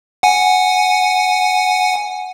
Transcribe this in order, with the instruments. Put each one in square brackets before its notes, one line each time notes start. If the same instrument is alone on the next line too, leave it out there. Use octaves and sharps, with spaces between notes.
[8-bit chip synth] F#5 G#5